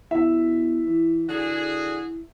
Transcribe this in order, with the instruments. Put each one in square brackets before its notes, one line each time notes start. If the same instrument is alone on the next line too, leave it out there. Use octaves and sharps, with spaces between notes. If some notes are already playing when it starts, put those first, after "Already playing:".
[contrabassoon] B2 [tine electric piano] E4 [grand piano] E5
[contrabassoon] E3
[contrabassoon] D3 [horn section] F#4 G#4